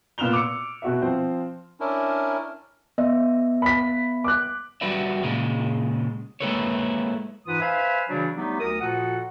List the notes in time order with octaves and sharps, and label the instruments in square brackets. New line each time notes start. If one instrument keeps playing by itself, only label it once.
[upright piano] A#2 B3 F6 E7 F7 G7
D6 E6 C#7
B2 F#4 E5
F3 C4 C5
[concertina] C#4 D4 E4 A#4
[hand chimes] B3 E5 [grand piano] D#5
[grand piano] B5 B6
D6 F#6
[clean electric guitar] F#3 G3 F#4 B4 D5 E5
A#2 C#3 G#3
G#3 A#3 E4 A4 B4 C#5
[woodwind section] G#2 E3 F4 B4 D#6
B4 C5 E5 F5 G#5 B5
C#3 E3 F#3 G3 D4 F#4
F#3 G3 A3 B3 D#4 G4
D2 A#4 D#6
A#2 F3 F#4 A4 F#5